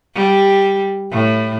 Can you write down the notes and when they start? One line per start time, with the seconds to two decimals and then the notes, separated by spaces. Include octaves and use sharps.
0.15 G3
1.11 A2